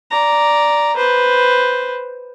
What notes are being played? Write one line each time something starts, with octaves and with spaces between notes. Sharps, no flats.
D5 A#5
B4 C5